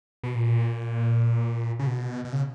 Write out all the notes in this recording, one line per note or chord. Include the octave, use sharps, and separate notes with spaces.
B2
A#2
C#3
B2
B2
C#3